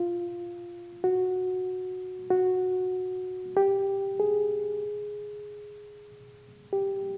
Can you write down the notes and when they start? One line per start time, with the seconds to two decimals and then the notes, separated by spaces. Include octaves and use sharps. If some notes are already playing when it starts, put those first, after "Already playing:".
Already playing: F4
1.04 F#4
2.30 F#4
3.57 G4
4.20 G#4
6.73 G4